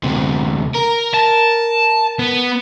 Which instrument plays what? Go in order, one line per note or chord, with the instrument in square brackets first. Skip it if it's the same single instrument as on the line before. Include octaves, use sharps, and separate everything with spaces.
[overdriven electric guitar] D2 C3
A#4
[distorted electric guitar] A5
B3